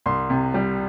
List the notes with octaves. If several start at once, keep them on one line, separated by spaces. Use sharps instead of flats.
C2 C6
C3
G3